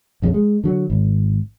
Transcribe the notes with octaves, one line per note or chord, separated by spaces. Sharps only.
A#1 F2 C#3
G#3
D3 F#3
G#1